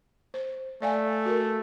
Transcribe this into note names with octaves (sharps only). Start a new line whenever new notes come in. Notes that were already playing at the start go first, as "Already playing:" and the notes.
C5
A3 D5 F5 G#5
F#4 A#4